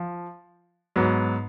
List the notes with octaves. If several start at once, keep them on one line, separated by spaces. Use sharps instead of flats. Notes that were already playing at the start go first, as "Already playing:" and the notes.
Already playing: F3
G#2 F#3 B3